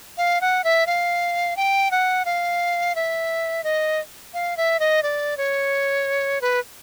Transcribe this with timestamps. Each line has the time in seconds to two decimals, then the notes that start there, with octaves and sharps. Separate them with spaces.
0.18 F5
0.41 F#5
0.64 E5
0.87 F5
1.57 G5
1.91 F#5
2.25 F5
2.95 E5
3.64 D#5
4.34 F5
4.57 E5
4.80 D#5
5.03 D5
5.37 C#5
6.41 B4